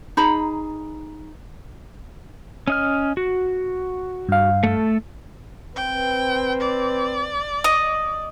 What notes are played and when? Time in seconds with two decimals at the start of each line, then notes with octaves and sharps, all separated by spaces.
0.17 D#4 G#4 A#5 B5
2.68 C#4 D#5 F6
3.17 F#4
4.29 G2 F5
4.63 A3 A4
5.76 C4 B4 G5
6.61 D5
7.64 D#5